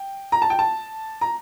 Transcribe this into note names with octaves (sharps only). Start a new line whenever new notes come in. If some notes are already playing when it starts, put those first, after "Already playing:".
Already playing: G5
A#5
A5
G5
A5
A#5